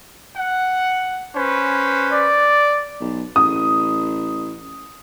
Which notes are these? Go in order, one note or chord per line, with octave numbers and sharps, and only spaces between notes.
F#5
C#4 B4 C5
D5
B1
A1 D#6